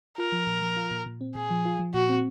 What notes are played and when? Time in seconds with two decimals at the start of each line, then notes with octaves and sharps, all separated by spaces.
0.18 F4 A#4
0.32 F3
0.47 A#2
0.62 F3
0.77 F4
0.91 A#2
1.06 A#2
1.21 C4
1.35 A#2 G#4
1.50 F3
1.65 F4
1.79 F3
1.94 A#2 F#4
2.09 C4